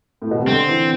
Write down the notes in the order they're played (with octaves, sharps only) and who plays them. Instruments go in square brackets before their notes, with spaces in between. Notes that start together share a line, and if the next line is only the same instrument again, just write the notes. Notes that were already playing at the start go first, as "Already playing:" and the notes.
[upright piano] A2
B2
C3
[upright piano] D3 [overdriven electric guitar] C4
[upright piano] E3